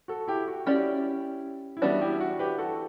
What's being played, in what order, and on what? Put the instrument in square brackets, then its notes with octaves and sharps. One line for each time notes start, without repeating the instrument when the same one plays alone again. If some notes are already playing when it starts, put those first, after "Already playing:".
[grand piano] F#4 A4
E4 G4
F#4
[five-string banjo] C#4 G4 D5 [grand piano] E4
[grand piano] E4
[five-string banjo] E3 G3 B3 D4 [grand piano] F#4
[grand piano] E4 G4
F#4
G4 B4
F#4 A4